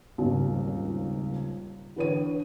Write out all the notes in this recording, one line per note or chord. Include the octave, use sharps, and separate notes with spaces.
D#1 G#1 C#2
D3 E3 B4 C#5 D#7